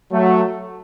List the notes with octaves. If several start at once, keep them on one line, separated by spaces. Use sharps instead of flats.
F#3 A3